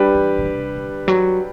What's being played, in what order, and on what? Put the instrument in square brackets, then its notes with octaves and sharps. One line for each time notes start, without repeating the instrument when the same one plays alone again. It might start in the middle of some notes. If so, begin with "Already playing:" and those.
Already playing: [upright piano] G3 D4 G4 B4
[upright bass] E3
B2
C3
D3
F#3